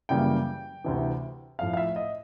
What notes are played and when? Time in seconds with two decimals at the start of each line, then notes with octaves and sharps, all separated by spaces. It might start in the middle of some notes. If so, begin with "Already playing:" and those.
0.09 F#2 C#3 E3 G3 A#3 G5
0.84 D2 C3 E3
1.59 A2 F3 A3 F5
1.73 F5
1.77 E5
1.96 D#5